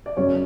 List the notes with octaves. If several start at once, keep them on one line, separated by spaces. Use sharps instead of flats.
D5
F#2 C#3 F#3 C#4 C#5